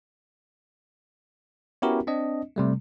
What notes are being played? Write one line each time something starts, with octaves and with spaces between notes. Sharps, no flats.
B3 C#4 E4 F#4 G4 A#4
C4 D4 D#5
C3 G3 A3